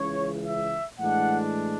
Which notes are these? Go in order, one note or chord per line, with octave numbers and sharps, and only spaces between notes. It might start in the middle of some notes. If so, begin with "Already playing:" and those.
Already playing: C#2 C#3 E3 C#5
E5
A2 E3 G#3 D4 F#5